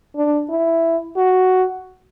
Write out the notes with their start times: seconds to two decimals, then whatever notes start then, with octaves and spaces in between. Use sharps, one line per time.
0.16 D4
0.50 E4
1.17 F#4